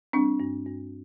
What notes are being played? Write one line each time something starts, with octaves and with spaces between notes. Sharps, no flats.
G3 C4 D4
G2
G2